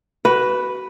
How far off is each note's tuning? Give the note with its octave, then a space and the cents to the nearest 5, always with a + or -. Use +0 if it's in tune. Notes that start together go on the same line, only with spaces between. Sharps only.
F#4 +30 B4 +0